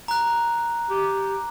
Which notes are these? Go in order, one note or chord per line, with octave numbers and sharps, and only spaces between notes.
A#5 F#6
G4